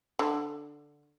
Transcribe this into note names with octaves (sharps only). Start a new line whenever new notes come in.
D3